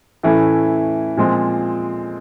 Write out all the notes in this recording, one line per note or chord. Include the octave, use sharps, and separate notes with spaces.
A2 E3 A3 C#4 E4
A#2 F3 G#3 C4